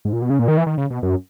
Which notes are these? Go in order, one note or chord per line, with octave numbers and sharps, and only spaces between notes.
G#2
A#2
B2
C#3
A#2
D#3
E3
D#3
C#3
B2
F#2